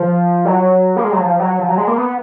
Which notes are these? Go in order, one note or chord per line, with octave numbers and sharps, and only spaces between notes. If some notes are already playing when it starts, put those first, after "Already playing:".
Already playing: F3
F#3
A#3
G#3
F#3
F3
F#3
F3
F#3
G#3
A#3
B3